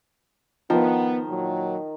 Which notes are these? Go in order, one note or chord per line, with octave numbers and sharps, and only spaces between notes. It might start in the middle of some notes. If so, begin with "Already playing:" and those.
D#3 F3 B3
A#2 F#3